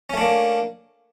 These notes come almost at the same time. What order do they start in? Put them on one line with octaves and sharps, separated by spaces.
C#4 A3 D4 A#3